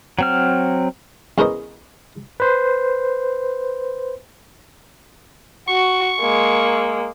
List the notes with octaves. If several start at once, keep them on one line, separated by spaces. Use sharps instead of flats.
F#3 C4 F6
E2 C#4 A#4 C5 D#5
B4 C5
F#4 C#6
G#3 A#3